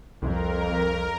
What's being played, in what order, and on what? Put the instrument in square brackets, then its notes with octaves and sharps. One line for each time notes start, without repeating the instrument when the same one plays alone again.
[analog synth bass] C2 [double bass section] F2 [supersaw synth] A#4